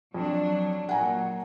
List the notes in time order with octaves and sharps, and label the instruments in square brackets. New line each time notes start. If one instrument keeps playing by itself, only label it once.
[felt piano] F2 [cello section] F#3 D4
[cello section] A#2 F#3 [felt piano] F#5 G#5 A#5